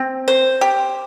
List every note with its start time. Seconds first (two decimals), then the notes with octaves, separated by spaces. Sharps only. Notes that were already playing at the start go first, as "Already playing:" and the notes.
Already playing: C4
0.28 C5
0.61 G4